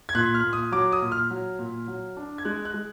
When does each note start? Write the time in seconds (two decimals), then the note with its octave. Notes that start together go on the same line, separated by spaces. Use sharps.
0.09 G#6
0.15 A#2 F#6
0.34 F6
0.43 A#2
0.53 D#6
0.72 F#3 D6
0.92 D#6
1.02 A#2
1.12 F6
1.30 F#3
1.59 A#2
1.87 F#3
2.17 D4
2.38 G#6
2.45 G#3 F#6
2.65 F#6
2.74 G#3